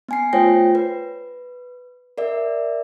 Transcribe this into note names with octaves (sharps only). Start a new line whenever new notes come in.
B3 G#5 C7
A3 F4 C5 C#5 G5 A#6
B4
A#4 D5 E5